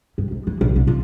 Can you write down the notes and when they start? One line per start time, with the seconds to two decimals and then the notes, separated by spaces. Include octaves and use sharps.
0.18 G2
0.31 G#2
0.47 E3
0.61 A#1
0.76 C2
0.87 F4